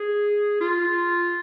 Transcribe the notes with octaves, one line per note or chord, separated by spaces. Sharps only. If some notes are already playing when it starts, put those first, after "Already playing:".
Already playing: G#4
F4